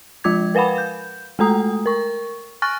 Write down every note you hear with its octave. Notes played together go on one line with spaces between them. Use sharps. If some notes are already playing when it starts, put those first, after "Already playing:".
F3 G#3 F4 D6 G#6
A#4 B4 F5 F#5 B5
G6
G#3 A3 A4 A#5 D#6
A#4 C#6
G#5 C#6 F6 F#6 A6